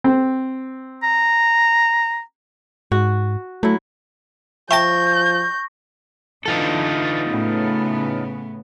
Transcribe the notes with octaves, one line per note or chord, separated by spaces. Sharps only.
C4
A#5
G#2 F#4
F#3 A3 E4
F3 E5 G5 A5 C#6 G6 A#6
D3 E3 D#4 F4 A4
A2 C#3 B3